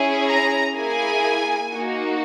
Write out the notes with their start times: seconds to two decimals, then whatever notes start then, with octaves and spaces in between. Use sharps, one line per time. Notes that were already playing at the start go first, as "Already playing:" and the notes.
Already playing: C#4 E4 G#4
0.28 A#5
0.75 A#3 E4 G#4 G#5
1.71 A#3 D#4 F#4